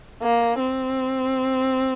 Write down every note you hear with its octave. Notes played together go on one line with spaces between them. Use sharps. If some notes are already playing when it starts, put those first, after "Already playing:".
A#3
C4